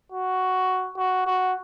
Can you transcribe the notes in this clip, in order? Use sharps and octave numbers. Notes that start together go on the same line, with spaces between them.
F#4
F#4
F#4